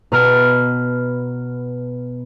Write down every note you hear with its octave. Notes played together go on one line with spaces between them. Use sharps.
B2 B4 A#5 F6 C#7 D7